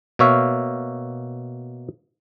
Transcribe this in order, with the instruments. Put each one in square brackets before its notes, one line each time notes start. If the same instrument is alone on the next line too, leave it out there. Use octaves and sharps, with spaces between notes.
[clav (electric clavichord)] B2 A#3 C#5 E5 F5